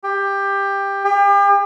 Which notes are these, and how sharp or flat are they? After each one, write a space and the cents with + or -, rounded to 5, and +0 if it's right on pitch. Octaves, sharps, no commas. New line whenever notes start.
G4 +15
G4 +40